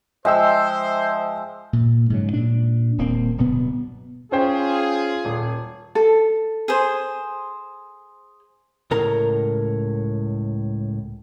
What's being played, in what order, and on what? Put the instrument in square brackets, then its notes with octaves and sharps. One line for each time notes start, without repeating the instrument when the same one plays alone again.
[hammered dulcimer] F3 G#3 [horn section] C5 [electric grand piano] E5 G5 E6
[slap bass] A#2
G#2 C#3 F#3
A#2 D4
D#1 A#3 C4
D1 G2 B2 B3
[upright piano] C#4 C5 G5 [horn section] F4 G#4
[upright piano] D#1
[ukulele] A4
[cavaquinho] G#4 C5
[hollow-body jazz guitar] C#2 A2 A#4 A#5